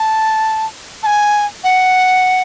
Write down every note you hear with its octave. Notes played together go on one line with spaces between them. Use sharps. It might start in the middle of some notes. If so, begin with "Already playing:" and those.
Already playing: A5
A5
G#5
F#5